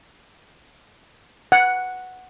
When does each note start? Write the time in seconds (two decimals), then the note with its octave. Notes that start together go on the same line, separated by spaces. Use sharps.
1.52 F#5